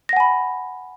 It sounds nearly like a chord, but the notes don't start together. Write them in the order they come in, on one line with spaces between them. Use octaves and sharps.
A#6 F#5 G#5 B5